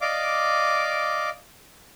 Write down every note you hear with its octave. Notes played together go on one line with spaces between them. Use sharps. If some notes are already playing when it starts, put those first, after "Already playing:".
D5 D#5 F5 D6